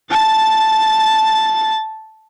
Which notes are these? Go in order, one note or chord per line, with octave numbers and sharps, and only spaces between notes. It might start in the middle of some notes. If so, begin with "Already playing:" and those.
A5 A6